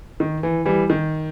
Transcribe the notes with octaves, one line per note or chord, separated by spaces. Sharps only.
D#3
E3
E3 G3
D#3